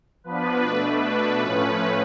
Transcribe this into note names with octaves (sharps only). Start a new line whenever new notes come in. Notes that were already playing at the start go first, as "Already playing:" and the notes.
F3 B3 D4 B4
B2 A3 D4
B2 A3 D4 B4
A2 F3 A3 C#4 B4